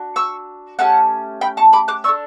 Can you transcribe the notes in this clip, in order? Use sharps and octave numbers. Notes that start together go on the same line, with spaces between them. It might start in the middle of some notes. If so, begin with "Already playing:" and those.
Already playing: D4 F#4
C#6 E6
A3 C#4 G4 F#5 A5
G5 B5
A5 C#6
B5 D6
D6 F#6
D4 A4 C#6 E6